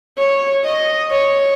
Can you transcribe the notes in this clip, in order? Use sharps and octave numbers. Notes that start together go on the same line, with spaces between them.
C#5
D#5
C#5